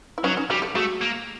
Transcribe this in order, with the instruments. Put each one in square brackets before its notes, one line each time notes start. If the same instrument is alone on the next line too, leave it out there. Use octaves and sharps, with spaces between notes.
[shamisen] E4
[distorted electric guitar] F#3 [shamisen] C#4 D#4
[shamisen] C#4 D#4
[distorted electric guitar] G3 [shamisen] F#4 G#4
[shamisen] G4 A4
[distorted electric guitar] A3 [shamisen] F#4 G#4
[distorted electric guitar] A#3